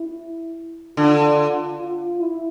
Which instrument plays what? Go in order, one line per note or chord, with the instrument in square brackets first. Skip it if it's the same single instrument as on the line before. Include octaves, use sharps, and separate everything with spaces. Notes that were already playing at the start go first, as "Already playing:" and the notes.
Already playing: [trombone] E4
[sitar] D3 [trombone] F4
[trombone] F4
E4